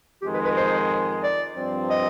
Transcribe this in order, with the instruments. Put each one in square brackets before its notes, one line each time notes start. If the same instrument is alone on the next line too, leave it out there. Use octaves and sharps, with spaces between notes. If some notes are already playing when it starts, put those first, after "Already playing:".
[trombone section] F2 D#3 G#3 [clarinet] G4
[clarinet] B4
B4
C5
D5
[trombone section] G2 F3 C4
[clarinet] D#5